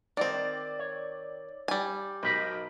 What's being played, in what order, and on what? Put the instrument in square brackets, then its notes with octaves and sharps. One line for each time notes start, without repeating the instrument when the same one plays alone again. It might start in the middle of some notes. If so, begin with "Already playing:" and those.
[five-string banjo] D#3 C4 [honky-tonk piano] D5
[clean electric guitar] C#5
[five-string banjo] G3 G#5
[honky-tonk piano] B1 [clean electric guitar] A#4 C5 B5